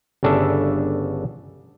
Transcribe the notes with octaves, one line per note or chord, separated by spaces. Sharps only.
G1 C#3 D4 A4 E5